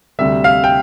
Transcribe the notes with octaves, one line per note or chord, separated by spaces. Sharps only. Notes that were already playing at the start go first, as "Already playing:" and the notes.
D2 C3 G3 E5
F5
G5